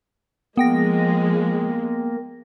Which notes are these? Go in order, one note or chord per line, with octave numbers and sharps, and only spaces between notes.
F3 G#3 A#3 B3 G5 A#6